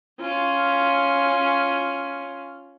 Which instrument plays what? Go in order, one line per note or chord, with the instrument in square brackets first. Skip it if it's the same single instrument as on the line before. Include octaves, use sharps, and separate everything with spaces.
[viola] C#4 F4